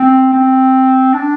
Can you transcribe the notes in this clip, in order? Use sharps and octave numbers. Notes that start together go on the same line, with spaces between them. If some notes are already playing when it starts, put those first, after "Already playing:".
Already playing: C4
C4
D4